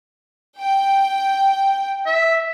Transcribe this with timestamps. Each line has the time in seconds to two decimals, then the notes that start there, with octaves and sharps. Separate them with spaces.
0.60 G5
2.06 E5